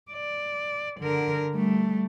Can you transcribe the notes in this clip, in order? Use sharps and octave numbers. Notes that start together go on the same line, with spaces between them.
D5
D3 A#4
G3 A3